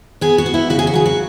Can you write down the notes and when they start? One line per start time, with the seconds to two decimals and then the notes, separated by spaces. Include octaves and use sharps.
0.21 B3 G#4
0.38 F#4
0.46 B3
0.54 E4
0.70 C#3 F#4
0.79 G#4
0.87 F#4
0.94 F#3 G#4
1.06 F#4